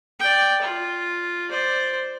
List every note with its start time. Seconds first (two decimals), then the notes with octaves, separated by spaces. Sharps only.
0.20 D5 G5
0.61 F4
1.49 C5 D5